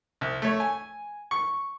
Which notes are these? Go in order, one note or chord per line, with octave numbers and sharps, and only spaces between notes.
C2
A3 C#5
G#5
C#6